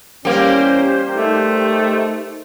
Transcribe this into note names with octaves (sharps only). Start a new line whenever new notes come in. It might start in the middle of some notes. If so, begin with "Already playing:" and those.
E2 G3 A#3 C#4 G4 A#4 C5
A3 D#4